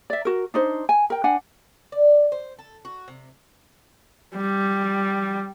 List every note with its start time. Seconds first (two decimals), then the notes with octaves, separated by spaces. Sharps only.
0.10 D5 E5
0.25 F#4 A#4
0.54 D4 D#4 C5
0.89 G#5
1.10 A#4 G5
1.24 D4 F#5 G#5
1.92 D5
2.32 C5
2.59 A4
2.85 F#4
3.08 C3
4.36 G3